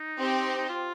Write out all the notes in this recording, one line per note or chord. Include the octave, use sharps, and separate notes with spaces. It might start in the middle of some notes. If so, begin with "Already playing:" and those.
Already playing: D#4
C4 G4 C5
D#4
F4